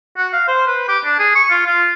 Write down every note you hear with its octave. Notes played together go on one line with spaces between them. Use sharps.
F#4
F5
C5
B4
G4
D4
G#4
C#6
F4
F4